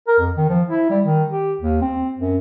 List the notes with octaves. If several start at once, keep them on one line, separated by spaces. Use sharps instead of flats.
A#4
F2
D#3
F3
E4
G3
D#3
G4
D#2
C4
F#2